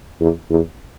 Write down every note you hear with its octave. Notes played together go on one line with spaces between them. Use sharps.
E2
E2